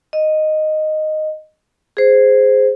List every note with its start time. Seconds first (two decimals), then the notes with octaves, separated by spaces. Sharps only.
0.13 D#5
1.97 G#4 C5